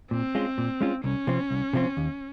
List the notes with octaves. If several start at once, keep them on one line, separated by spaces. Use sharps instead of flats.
A#2 C4
G#3 C#4 F4
A#2
G#3 C#4 F4
C2 C#4
C3 F3 C4
C2
C3 F3 C4
D#2